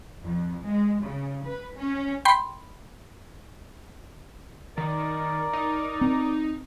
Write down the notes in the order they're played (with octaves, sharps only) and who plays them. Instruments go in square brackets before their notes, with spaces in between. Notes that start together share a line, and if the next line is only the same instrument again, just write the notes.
[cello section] F2
G#3
C#3
B4
C#4
[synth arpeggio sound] G5 B5 C6
[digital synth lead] D#3 [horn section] A#4 D5
[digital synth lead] D#4
[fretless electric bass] C4